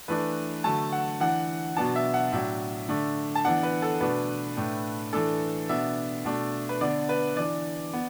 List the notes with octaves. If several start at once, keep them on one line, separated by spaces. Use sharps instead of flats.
E3 A3 D4 B4
D3 F#3 A3 A5
F#5
E3 D4 F#5
B2 F#3 B3 D4 A5
E5
F#5
A2 F#3 D4 E5
D3 A3 D4
A5
E3 B3 D4 F#5
B4
A4
B2 A3 D4 B4
A2 A3 D4
E3 A3 D4 A4
B2 B3 D4 E5
B2 A3 D4
B4
D3 B3 D4 D5
B4
E3 D4 D5
B3